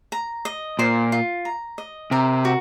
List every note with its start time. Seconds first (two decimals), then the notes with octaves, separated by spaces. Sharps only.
0.12 A#5
0.45 D#5
0.79 A#2 C5
1.12 F4
1.45 A#5
1.78 D#5
2.11 C3 A#4
2.45 F#4